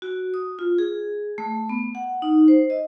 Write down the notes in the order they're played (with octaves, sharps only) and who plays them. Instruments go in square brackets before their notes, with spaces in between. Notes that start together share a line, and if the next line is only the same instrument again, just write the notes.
[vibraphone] F#4
D#6
F4
G#4
A3
B3
F#5
D#4
C5
D#5